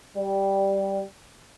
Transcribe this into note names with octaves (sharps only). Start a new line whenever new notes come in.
G3